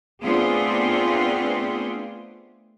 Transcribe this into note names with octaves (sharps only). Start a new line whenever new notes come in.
A3 B3 C4 D4 F4 G#4